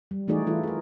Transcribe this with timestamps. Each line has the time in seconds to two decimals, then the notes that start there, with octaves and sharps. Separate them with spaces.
0.11 G3
0.28 E3 A3 D#4 F#4 G#4 D5
0.47 E3 E4 F4 A4
0.63 G#4 A#4